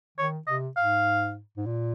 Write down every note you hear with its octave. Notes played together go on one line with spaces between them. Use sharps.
D#3 C#5
C3 D#5
G#2 F5
G#2
A#2